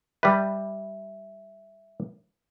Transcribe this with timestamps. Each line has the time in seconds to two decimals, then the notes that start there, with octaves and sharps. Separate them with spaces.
0.23 G3 G4 B4 E5